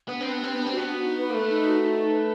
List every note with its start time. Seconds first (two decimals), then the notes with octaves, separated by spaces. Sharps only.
0.08 B3 D4
0.20 C4 B4
0.32 B3
0.40 C4 G4
0.55 B3 D4
0.67 C4 F#4
0.77 B3
0.87 F#4
1.02 D#4
1.18 B4
1.30 A#3
1.34 A3 B4
1.49 D#4
1.65 F#4
1.81 D#4
1.97 B4
2.12 B4